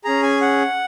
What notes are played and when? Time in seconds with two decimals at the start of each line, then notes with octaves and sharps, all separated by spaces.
0.04 C#4 G#4 A#5
0.23 G#5
0.41 F#5